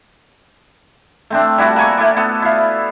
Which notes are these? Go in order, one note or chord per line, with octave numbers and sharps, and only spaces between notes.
A3 C4 D4
G3 E4 F#4 A5
A#3 G#5 C#6
A3 E4 D5
B3 A4
E4 F5